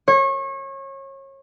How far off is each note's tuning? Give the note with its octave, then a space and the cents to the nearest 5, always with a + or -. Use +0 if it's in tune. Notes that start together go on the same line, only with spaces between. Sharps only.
C#5 -30